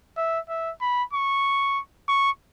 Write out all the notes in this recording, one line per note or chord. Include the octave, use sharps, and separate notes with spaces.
E5
E5
B5
C#6
C#6